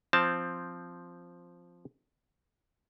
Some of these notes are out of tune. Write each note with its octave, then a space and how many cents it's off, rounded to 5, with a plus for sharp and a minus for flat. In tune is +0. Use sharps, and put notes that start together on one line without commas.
F3 +0 C4 +0 A5 +0